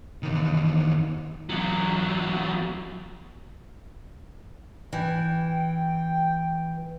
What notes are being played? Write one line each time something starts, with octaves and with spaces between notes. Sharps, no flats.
E2 D#3
E2 F#3
E3 G5